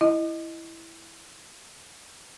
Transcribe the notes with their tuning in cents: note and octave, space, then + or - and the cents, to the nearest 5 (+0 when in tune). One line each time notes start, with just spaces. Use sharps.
E4 +0 D#5 +0